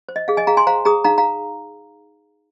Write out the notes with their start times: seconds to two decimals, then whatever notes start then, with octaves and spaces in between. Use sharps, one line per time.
0.09 C5
0.16 D#5
0.28 G#4 F5
0.37 D#5 G#5
0.47 G#4 F5 A#5
0.57 G#5 C6
0.67 C5 F5 A#5
0.85 G#4 A#5 D#6
1.04 D#4 F5 A#5
1.18 F5 A#5